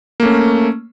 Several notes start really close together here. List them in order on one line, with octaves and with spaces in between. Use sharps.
A#3 A3 C#4